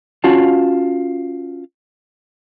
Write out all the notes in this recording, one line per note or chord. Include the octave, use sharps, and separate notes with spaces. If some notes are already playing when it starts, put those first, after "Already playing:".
C#4 F4 F#4 F5 A5